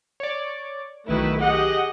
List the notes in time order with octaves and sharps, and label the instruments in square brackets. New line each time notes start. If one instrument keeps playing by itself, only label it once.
[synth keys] C#5 D5
[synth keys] B1 D#3 F#4 [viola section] A3 E4 B4
[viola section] G4 G#4 D#5 [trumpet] F#5